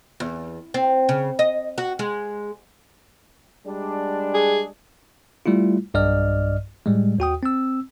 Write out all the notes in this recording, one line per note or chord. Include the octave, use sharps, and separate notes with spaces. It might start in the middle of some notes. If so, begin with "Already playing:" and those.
E2
C4
C#3
D#5
F#4
G#3
G3 G#3 D4
G#4
G3 A3 E4 F4
B1 G2 D5 D#5 F6
A2 G3 G#3
D#2 F#4 G5 D#6
C4 E6